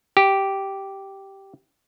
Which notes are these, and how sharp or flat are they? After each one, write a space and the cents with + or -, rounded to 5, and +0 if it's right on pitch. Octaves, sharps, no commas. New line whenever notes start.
G4 -5